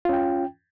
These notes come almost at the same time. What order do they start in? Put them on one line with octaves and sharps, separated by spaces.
F4 C#4 G5